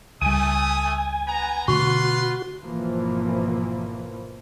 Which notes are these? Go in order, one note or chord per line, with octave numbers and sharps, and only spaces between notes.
C#2 G3 A3 G#5 D#6
B3 A#5
B2 D3 A3 F4 F#4 B4 C6
G#1 B2 E3 F3 A#3